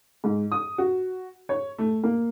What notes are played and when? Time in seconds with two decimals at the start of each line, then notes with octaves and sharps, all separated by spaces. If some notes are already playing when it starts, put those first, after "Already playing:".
0.24 G#2
0.52 D#6
0.78 F#4
1.49 C#5
1.78 A3
2.03 A#3